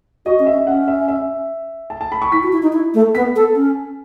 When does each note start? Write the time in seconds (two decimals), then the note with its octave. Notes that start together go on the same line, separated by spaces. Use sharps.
0.25 F#4 D#5
0.39 C#4
0.46 E5
0.53 C#4
0.67 C#4 F#5
0.88 E5
1.08 E5
1.90 A5
2.01 A5
2.12 B5
2.22 C#6
2.32 E4 B6
2.43 F#4
2.53 E4
2.63 D#4
2.73 E4
2.94 A3
3.15 B3 B6
3.36 A4
3.55 C#4